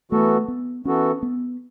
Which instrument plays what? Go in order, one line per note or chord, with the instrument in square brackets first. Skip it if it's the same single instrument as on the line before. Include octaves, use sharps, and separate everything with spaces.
[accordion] E3 B3 F#4 A4 [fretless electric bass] A3
[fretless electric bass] B3
[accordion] E3 B3 F#4 A4 [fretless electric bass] C#4
[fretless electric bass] B3